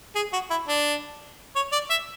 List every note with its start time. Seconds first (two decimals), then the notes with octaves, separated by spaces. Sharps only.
0.16 G#4
0.33 F#4
0.50 E4
0.68 D4
1.56 C#5
1.72 D5
1.90 E5